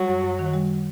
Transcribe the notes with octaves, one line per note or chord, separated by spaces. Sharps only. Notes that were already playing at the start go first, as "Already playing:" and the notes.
Already playing: F#3 G3
F#2
F#2
D#3
G3